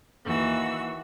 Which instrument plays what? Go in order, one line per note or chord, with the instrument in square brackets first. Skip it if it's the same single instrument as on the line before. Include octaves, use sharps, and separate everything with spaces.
[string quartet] D#2 E3 F#4 E6